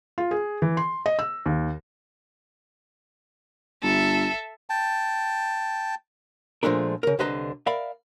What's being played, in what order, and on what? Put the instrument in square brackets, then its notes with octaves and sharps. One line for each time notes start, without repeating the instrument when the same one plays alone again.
[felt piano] F4
G#4
E3
C6
D#5
E6
D#2
[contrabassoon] G1 [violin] A4 E5
[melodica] G5 A5
[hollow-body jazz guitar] A#2 F3 G#3 A3 D4 A#4
C#3 A#4
C2 D3 B4 C5 D#5 A#5
A#4 D5 E5 F5 B5